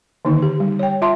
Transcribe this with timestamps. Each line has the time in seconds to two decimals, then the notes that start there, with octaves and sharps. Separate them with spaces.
0.25 D3 D#3 A#3 D#4
0.42 G4
0.60 G3
0.79 C#5 G5
1.02 F4 E5 A5 C6